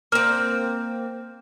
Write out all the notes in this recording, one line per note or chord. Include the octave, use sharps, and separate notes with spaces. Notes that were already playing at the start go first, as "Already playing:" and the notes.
A#3 C4 F6